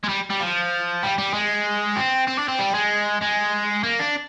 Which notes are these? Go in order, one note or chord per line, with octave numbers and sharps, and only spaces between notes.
G#3
G3
G3
F3
G3
G3
G#3
C4
C4
D4
C4
G3
G#3
G#3
A#3
D4